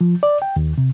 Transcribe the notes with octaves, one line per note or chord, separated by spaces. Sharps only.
F3
D5
G5
D#2
C3